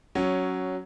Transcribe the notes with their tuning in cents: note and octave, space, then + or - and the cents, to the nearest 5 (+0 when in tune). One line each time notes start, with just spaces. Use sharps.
F#3 +5 C#4 +0